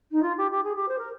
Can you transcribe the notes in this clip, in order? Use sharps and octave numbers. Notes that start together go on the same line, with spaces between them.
D#4
F4
G4
G4
G#4
G4
C5
A#4